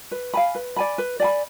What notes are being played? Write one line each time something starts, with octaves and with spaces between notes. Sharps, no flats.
B4
F5 G#5 B5
B4
D5 G#5 B5
B4
D5 G#5 B5